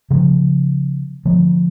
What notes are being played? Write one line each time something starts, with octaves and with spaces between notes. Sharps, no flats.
C#3 F3 A3
D3 F3 A3